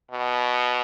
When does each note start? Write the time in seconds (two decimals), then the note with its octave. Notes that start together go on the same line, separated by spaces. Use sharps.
0.11 B2